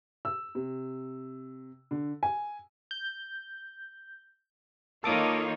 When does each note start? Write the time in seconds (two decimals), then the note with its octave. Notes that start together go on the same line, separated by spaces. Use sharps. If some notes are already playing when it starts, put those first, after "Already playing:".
0.25 E6
0.55 C3
1.91 D3
2.23 G#5
2.91 G6
5.04 D#3 A#3 D#4 F4 A4 C#5 D6 D#6